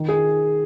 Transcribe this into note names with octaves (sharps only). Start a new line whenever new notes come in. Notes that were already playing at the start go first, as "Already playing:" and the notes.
Already playing: D#3
G#4